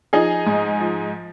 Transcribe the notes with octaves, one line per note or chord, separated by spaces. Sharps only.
F3 D#4 G#4
G#2
F3